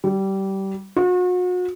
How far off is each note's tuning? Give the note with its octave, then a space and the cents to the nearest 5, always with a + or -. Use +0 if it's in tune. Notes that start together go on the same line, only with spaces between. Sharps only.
G3 -20
F#4 -40